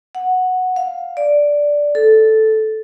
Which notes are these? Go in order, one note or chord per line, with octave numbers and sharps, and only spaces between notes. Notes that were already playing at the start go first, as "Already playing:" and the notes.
F#5
F5
D5
A4